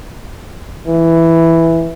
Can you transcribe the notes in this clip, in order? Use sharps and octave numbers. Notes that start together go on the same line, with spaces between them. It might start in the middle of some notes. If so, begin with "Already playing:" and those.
E3